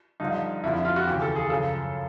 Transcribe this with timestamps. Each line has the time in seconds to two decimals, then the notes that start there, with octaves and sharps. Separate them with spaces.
0.20 G2 D3 F3 D#4
0.64 F2 D3 F3 E4
0.74 E4
0.85 F4
0.96 F#4
1.07 D#2 C#3 E3 G4
1.22 A4
1.36 G#4
1.50 F#2 C#3 F3 A4